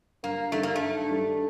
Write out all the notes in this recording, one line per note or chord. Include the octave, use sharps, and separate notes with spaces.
G2 A#3
D#3 G3 A3 D4 A4
A#3
G2 A3
D#3 G3 D4 A4